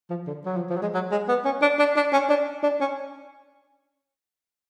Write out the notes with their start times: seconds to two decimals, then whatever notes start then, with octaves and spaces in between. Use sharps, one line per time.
0.10 F3
0.27 D3
0.45 F#3
0.57 F3
0.69 F3
0.77 F#3
0.82 G#3
0.94 F#3
1.11 G#3
1.28 B3
1.45 C#4
1.62 D4
1.79 D4
1.96 D4
2.12 C#4
2.29 D4
2.63 D4
2.81 C#4